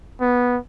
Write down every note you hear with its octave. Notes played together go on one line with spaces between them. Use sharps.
B3